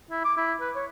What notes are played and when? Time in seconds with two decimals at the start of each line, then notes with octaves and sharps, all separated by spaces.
0.11 E4
0.25 D6
0.37 E4
0.61 B4
0.75 C#5